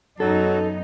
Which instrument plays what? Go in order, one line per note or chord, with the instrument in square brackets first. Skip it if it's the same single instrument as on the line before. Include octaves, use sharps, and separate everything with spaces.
[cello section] F#2 B3 D#4 [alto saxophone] F#3 [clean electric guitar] A4